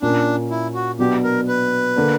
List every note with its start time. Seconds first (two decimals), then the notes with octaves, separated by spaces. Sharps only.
0.02 A#2 A#3 C#4 D4
0.51 E4
0.74 F#4
0.99 B2 F#3 B3 D4 F#4 G4
1.24 A#4
1.48 B4
1.96 D3 A#3 D4